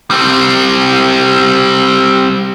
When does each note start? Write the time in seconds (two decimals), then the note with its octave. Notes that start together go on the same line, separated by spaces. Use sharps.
0.11 G3 C4